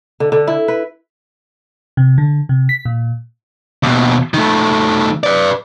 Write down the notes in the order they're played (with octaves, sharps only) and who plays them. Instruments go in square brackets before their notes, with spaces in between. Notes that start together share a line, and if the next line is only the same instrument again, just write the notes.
[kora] D3
D3
E4
B4
[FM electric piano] C3
D3
C3
B6
A#2
[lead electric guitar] D#2 B2
D#3 A3
B4 D5